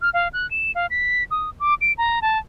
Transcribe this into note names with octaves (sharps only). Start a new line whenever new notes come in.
F6
F5
F#6
E7
F5
B6
D#6
D6
D7
A#5
A5